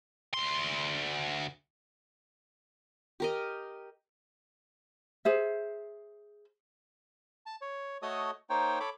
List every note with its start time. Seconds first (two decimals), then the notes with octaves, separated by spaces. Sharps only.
0.34 D2 C6
3.20 G4 A#4 D#5
5.25 G#4 C5 E5
7.46 A5
7.61 C#5
8.02 A3 F#4 A4 C#5 D#5 D#6
8.50 A#3 D#4 C5 C#5 G5
8.80 A4 C#5 B5 D6